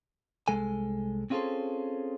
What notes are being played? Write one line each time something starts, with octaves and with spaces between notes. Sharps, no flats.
C2 G#3 A4 G#5
C4 C#4 F4 G#4 A4 C5